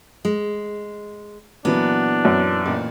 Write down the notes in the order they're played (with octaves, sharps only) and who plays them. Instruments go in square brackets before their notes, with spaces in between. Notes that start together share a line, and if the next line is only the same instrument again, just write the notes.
[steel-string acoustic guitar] G#3
[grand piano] A#2 E3 F#3 [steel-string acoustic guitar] B3 [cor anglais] D4
[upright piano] F#2
[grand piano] A1 A#2